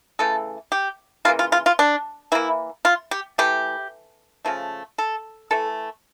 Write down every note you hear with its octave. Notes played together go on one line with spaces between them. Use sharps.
C#3 E3 A3 A4
G4
C#3 E3 A#3 F4
F4
F4
F4
D4
E3 A#3 E4
F4
G4
E3 A3 G4
C#3 F3 A3
A4
E3 A3 A4